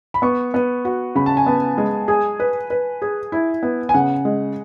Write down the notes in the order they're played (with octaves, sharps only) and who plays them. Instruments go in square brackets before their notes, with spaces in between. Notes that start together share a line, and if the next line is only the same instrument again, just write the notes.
[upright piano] B5
[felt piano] B3 [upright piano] C#6
[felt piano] B3
F#4
[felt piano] C#3 [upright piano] B5
[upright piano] A5
G#5
[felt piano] B3 [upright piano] A5
[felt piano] G#3
[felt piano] G#4 [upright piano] G#5
[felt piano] B4
B4
G#4
E4
B3
[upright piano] G#5
[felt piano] C#3 [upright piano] F#5
[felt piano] G#3